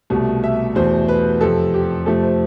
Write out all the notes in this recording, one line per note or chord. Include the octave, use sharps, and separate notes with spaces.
C2 B2 A3
E5
E2 B2 A3 C5
B4
F2 C3 F3 A4
G4
F2 C3 F3 A3 A4
C5